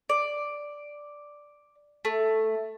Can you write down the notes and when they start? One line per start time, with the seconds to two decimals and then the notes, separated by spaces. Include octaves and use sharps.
0.09 D5
2.05 A3